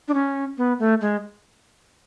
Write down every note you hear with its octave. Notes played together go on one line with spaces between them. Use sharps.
D4
C#4
B3
A3
G#3